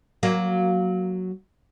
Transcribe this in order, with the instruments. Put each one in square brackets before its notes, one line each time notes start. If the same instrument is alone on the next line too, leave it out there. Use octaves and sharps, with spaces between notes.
[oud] F#3 A#3